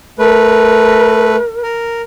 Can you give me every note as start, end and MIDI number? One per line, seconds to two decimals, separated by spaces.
0.19 1.36 57
0.19 1.61 70
0.19 1.36 71
1.63 2.02 70